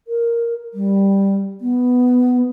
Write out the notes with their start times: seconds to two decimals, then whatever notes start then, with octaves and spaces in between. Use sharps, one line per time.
0.08 A#4
0.74 G3
1.61 B3